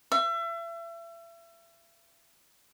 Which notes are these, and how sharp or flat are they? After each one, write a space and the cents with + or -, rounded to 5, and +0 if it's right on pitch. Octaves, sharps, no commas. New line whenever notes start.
E5 +35